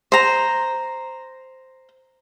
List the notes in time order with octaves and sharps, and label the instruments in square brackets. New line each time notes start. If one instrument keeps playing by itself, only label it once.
[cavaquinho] C5 A#5